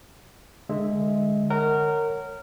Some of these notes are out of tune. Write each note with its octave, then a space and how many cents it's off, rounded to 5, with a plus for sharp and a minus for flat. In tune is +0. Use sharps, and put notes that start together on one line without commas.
D3 +35 G#3 +0 E5 +0
A#4 -15 C#5 +0 F#5 +15